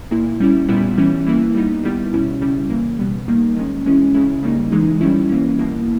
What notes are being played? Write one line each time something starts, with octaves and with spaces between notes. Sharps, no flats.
A#2 A#3 E4
G3 C#4 E4
A#2 G3 B3 E4
E3 G3 C#4 E4
E3 A#3 E4
G3 B3 D#4
D#3 G3 B3 E4
B2 G3 C#4 E4
C#3 G3 C#4 E4
C#3 E3 A#3
B2 G3 B3
D#3 G3 A#3 D#4
D#3 G#3 C#4
E3 G#3 C#4 E4
C#3 G#3 C#4 E4
C#3 G3 A#3 D#4
E3 G#3 D#4
D#3 G3 C#4 E4
E3 A#3 C#4
B2 A#3 E4